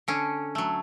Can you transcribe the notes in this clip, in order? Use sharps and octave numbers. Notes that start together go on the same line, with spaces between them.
D3 C#4
F#3 A3